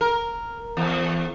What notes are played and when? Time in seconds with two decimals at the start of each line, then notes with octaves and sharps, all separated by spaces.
0.01 A#4
0.77 E2